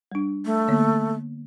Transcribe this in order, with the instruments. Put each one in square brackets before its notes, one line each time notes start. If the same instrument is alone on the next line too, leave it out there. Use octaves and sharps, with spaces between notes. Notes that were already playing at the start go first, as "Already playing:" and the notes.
[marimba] G3 D4
[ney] A3
[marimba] D3 A#3 B3